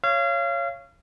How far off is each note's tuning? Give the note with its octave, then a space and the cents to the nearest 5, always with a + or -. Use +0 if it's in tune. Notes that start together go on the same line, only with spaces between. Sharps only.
C#5 +0 F5 -30